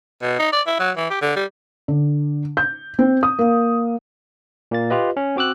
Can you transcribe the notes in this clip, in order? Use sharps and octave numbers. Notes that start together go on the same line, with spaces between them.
B2
D#4
D5
E4
F#3
E3
G4
D3
G3
D3
G6
C4
D#6
A#3
A#2 A#3 A6
F4 G4 B4 D#5
C#4
C4 F#4 D6 E6 F#6